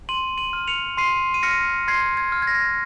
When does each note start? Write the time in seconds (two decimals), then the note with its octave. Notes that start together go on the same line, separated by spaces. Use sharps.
0.09 C6 D#7 F#7
0.38 D#7 F#7
0.53 F6
0.67 C#7 F7
0.97 C6 C7 D#7
1.34 D#7
1.43 F6 A#6 C#7
1.88 C6 G#6 C7
2.17 G#6
2.32 F6
2.42 G#6
2.47 A#6